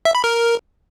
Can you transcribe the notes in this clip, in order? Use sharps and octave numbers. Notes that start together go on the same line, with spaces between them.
E5
B5
A#4